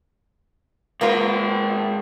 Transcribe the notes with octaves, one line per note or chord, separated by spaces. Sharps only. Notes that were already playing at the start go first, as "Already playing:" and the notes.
G#2 A#3 B3 F4 A#4